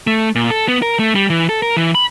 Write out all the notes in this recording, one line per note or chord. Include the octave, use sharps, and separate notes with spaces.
A3
A#2
A4
B3
A#4
A3
G3
E3
A4
A#4
E3
B5